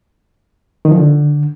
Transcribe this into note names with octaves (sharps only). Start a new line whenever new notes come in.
D#3
F3
D3